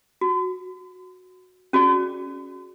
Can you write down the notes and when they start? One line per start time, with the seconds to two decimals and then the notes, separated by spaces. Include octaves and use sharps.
0.21 F#4
1.73 C#4 F#4 G#4 D5